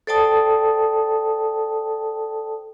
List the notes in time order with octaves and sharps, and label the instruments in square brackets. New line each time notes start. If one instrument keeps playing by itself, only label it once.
[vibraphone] A4 C5 D5 G5 A5 D#6